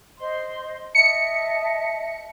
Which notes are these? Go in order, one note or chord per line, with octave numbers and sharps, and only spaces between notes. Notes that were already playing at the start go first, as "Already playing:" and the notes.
C5 D#5 C6
D#5 E5 A5 C#7